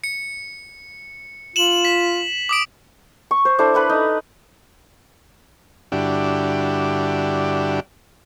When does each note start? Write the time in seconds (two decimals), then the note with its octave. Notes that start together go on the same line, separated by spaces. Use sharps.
0.04 C#7
1.56 F4 E7 F#7
1.85 B6
2.49 D6 D#6 D7
3.31 C#6
3.45 C5
3.59 D4 E4 A4 C5
3.74 E4 A4 B4 B5
3.89 D#4
5.92 G2 D3 D4 E4 F#4 G4